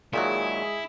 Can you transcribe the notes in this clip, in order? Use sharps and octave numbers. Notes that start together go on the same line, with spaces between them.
A#2 D#3 F#3 G#3 E4 G#4